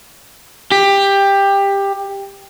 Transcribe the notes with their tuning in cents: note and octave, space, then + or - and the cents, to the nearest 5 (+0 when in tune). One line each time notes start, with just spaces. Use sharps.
G4 +15